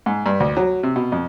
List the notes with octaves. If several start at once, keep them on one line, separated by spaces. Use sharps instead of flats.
G#2
G2
D2
F#3
C3
B2
F2